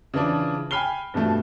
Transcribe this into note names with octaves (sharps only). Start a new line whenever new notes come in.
C#3 E3 F3 D4
G5 G#5 B5 F6 C7 G7
G2 B2 F3 A3